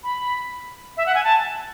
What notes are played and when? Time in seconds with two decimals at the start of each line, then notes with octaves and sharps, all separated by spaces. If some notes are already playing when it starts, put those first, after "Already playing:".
0.03 B5
0.97 E5
1.06 F#5
1.15 G#5
1.24 A5